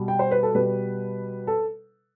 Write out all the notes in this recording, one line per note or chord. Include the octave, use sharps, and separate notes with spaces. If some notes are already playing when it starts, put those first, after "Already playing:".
Already playing: B2 G3
G5
C5
B4
A4
B2 G3 B4
A4